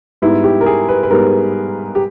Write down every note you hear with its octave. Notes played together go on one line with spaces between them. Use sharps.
G#2 G3 B3 E4
G4
A#4
G#4
B4
B4
G#2 G3 B3 A#4
G4